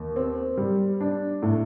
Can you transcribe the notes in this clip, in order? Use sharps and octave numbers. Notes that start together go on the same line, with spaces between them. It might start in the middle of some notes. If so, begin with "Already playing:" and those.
Already playing: D#2
C4
G3
D4
A2